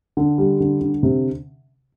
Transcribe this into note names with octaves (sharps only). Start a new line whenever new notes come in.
D3
G3
D3
D3
C3